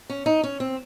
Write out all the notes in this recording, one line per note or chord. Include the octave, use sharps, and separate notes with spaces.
C#4
D#4
C#4
C4